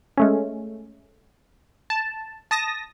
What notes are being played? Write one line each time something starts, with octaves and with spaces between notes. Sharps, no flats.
G#3 A3 C#4
A5
A5 D#6 A#6